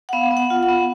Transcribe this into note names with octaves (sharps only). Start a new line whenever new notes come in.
F#5
B3 F5
B3
F#5
F4
F#5
B3